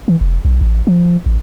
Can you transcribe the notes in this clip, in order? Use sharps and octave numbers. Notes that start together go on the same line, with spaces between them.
E3
F1
B1
A1
F3
A1